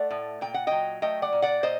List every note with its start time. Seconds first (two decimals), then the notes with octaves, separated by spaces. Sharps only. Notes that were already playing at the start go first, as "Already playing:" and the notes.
Already playing: A3 D5 F#5
0.11 A2
0.41 A#2 G5
0.54 F#5
0.67 F#3 D#5 G5
1.02 A3 D#5 G5
1.22 D5 F#5
1.33 A#2
1.42 D5 F#5
1.63 A#2 C5 D#5